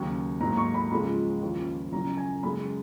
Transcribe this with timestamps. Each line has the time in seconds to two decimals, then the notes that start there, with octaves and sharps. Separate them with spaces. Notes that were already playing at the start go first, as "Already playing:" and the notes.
Already playing: D#2 C#3 F#3
0.40 G#2 F#3 A#3 A#5
0.57 C#6
0.74 B5
0.91 C#2 C#3 F3 G#3 B5
1.42 D#2 C#3 F3
1.92 F#2 C#3 F#3 A#5
2.17 G#5
2.43 F#2 C#3 G#3 B5